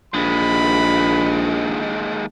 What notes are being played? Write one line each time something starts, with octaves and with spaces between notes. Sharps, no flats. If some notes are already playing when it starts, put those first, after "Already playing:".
A#1 D#2 G#3 B5